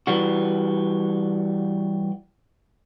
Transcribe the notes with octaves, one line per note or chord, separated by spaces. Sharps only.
E3 G3 F#4